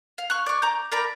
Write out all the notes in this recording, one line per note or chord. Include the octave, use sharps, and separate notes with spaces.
F5
C#6 F6 F#6
D5 C#6
A#5 D6 G6
A#4 D5 A#5 B5